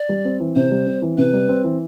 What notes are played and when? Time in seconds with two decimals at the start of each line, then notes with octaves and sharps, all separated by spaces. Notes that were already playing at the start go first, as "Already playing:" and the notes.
Already playing: D5
0.09 G3
0.25 C4
0.40 E3
0.56 C3 C5
0.71 G3
0.87 C4
1.02 E3
1.18 C3 B4
1.33 G3
1.49 C4
1.64 E3